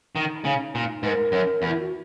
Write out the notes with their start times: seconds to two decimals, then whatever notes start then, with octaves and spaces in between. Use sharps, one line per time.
0.16 D#3 D#4
0.45 C#3
0.75 A#2
1.03 G#2 B4
1.08 A#4
1.32 F#2
1.62 E2
1.68 E4
1.79 F#4